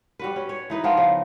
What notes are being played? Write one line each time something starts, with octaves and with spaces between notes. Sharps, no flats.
G3 F#4 B4
C#4
C#5
E3 D#4 B4
F3 B3 F4 A#4
C#3